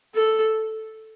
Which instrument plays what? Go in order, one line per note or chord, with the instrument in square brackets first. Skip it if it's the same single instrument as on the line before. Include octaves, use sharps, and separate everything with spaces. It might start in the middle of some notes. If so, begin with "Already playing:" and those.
[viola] A4